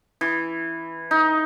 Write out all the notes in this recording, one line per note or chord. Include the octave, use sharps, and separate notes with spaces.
E3
D#4